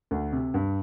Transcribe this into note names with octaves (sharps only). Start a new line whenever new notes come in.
D2
C3
G2